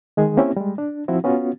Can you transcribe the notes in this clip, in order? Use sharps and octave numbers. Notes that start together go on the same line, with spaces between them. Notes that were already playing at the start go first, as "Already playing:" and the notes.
D#3 G#3 G#4
A#3 C4 C#4 E4 G4
G3 G#3
D4
F3 C4 E4 F#4
B3 C#4 F4 F#4